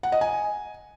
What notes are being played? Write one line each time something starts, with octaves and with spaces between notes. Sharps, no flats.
F#5
D#5
G#5